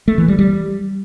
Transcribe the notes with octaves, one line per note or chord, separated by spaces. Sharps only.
A3
E3
G3
G3